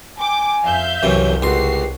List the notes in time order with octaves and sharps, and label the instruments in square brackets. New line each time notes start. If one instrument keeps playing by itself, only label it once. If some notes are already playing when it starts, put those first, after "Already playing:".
[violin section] G5 D6 [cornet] G#5
[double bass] F2 [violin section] E5 F5 G6
[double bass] C2 [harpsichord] F#2 C3 E3 [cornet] C#5
[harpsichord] C#2 C6 [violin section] F#4 C7 [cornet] G4